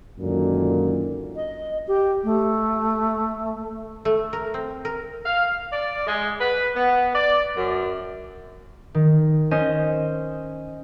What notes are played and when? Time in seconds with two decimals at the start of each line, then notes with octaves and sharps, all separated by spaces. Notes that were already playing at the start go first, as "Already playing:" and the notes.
0.18 C#2 F#2 A#2 D3 D#3
1.36 D#5
1.88 G4
2.24 A3
4.05 A3
4.33 A#4
4.54 C4
4.85 A#4
5.26 F5
5.72 D5
6.07 G#3
6.40 B4
6.75 B3
7.14 D5
7.56 F#2
8.94 D#3
9.51 C#4 C5 D#5